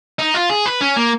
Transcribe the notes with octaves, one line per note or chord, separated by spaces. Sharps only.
D#4
F4
G#4
B4
C#4
A#3